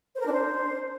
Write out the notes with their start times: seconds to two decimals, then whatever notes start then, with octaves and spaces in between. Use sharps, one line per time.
0.14 C5
0.20 A#4
0.25 D4
0.31 C5